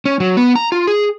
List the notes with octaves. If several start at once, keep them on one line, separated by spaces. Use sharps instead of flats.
C#4
F#3
B3
A#5
F4
G#4